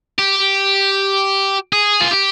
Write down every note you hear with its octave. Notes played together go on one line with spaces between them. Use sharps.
G4
G#4
F4
G4